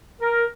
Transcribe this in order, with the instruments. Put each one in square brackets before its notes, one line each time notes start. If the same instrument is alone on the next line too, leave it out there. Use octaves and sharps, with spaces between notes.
[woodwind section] A#4